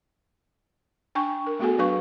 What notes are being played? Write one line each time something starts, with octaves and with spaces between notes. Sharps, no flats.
D4 G5 G#5 C#6
A#4
A3 B3 F#4 G#4 A4 G#5
F#3 D4 B4 F5 C#6